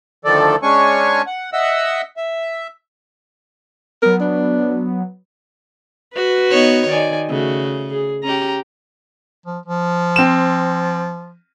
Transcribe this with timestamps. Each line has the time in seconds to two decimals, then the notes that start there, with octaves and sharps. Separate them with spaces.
0.25 D2 D#3 F3 A4 D5
0.63 G#3 C#4 D4 C#5 G#5 C#6
1.27 F#5
1.53 D#5 E5 F#5 E6
2.17 E5
4.02 F#3 B3 A#4
4.20 D4
6.13 F#4 B4
6.51 B3 D#4 C#5
6.89 D#3 D5 G#5
7.29 C#3 A3 F#4
7.90 G#4
8.24 C#4 G4 A#5
9.46 F3
9.66 F3
10.16 C4 E7